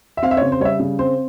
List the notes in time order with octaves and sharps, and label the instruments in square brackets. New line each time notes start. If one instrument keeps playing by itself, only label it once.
[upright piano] E5
C4 F5
E5
C#3 C#5
C5
G3 C#5
E5
C#3
C4 C5